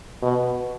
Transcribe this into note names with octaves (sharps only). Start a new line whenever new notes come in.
B2